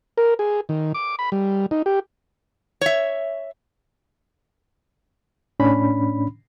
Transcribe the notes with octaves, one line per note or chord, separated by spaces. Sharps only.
A#4
G#4
D#3
D6
B5
G3
D#4
G4
C#5 E5
A2 C#4 D4 B5